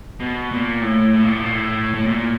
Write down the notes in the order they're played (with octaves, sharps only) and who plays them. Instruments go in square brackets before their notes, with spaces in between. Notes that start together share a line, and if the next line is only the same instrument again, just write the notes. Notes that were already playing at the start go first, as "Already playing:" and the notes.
[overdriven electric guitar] B2
A#2
A2
A2
A#2
A2
A#2
A2
A2
A#2